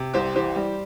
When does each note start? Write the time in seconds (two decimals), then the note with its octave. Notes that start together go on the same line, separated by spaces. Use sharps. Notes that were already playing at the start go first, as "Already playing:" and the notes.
Already playing: C3
0.14 C2 G4 C5
0.35 E3 G4 C5
0.56 G3